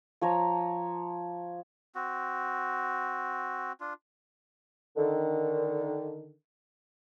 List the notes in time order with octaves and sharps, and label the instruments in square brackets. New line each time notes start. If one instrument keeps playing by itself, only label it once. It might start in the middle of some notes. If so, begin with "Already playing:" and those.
[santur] F3 C#5 A#5
[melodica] C4 F#4
D4 F4
[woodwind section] D3 D#3